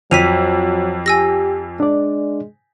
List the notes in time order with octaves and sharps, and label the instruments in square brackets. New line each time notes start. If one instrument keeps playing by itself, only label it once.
[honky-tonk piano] F2 [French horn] F#3 [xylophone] B6 D#7 F7
[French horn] G4 [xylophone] G#5 E6 A#6
[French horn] G#3 [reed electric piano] D4 D5